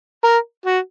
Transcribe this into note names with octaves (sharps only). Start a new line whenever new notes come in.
A#4
F#4